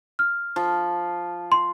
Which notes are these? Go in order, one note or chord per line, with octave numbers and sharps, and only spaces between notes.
F6
F3
C6